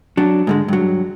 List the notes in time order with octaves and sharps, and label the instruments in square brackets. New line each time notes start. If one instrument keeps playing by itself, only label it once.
[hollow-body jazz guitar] F#3 D4
G#2 D3 G#3
G2 F#3